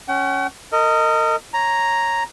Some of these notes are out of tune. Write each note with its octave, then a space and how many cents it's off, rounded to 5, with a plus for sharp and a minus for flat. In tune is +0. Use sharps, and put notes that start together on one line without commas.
C#4 +0 F#5 +45
A#4 -35 D#5 +5
C#5 -5 A#5 +0